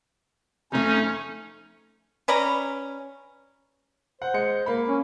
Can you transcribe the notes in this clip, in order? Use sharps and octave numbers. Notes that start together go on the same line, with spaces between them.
F2 A3 C#4 D#4
C#4 B4 D5 A#5
C5 F#5
G#3 C#7
A#3 B5
C#4